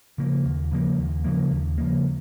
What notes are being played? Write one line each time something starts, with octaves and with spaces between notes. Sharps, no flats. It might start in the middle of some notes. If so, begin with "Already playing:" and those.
C#3 F3 A#3
D#2
C#3 F3 A#3
D#2
C#3 F3 A#3
D#2
C#3 F3 A#3